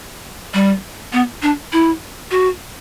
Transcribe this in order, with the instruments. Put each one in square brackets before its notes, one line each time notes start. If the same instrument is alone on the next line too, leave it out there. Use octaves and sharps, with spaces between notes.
[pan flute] G3
B3
D4
E4
F#4